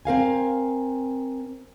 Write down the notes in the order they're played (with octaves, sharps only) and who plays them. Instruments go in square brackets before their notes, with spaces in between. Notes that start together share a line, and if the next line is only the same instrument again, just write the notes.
[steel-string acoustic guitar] C4 A#4 F5 G#5